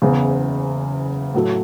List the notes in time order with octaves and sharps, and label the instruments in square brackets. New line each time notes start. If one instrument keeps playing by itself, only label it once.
[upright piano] F#1 E2 C#3
A2 F#3 A3